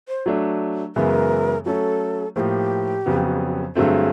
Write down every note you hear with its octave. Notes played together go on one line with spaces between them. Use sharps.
C5
F#3 A3 D4
F#2 C#3 E3 G#3 B3 A#4
F#3 A3 C#4 A4
A2 F3 A#3 G4 G#4
F2 C#3 F#3 B3
G2 D3 F#3 A3 C4 G#4